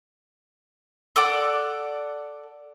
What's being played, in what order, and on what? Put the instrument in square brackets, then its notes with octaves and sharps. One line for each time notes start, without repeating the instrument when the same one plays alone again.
[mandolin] A4 D5 F#5 D6